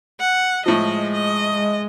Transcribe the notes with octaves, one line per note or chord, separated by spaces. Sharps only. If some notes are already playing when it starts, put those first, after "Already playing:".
F#5
A2 F3 G#3 D#5
D#5
G#3